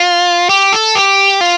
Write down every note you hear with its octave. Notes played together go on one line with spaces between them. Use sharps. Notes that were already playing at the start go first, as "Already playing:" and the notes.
Already playing: F4
G4
A4
G4
F4